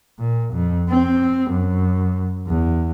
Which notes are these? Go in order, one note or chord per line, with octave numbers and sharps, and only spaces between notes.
A#2
F2
C4
F#2
E2